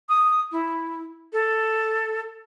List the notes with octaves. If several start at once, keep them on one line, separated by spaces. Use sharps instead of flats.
D#6
E4
A4